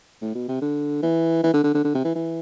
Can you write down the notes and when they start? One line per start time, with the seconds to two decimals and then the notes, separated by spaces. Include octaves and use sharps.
0.22 A2
0.35 B2
0.48 C3
0.62 D3
1.03 E3
1.44 E3
1.54 D3
1.64 D3
1.75 D3
1.85 D3
1.95 C3
2.05 E3
2.15 E3